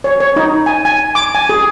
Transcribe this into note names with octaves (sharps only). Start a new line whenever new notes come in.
C#5
C#5
D#4
G#5
G#5
D6
G#5
G#4